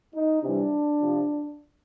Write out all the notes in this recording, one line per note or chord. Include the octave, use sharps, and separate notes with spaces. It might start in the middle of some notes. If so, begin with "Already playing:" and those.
D#4
C3 E3 G3 D4
C3 F3